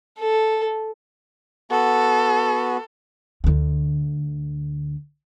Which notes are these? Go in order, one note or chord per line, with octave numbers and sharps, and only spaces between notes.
A4
B3 F#4 A4
D2 D3